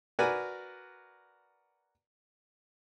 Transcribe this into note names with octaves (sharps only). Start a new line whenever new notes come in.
F#4 A#4 B4 D5 G#5 A#5